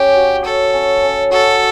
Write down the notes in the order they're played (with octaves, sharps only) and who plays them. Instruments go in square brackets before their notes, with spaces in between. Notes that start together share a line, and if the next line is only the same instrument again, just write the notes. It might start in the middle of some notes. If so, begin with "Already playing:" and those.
Already playing: [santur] C#4 [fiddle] G4
[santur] F#4
[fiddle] A4 [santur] C#5
[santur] C#4
C#4
[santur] F#4 [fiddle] A4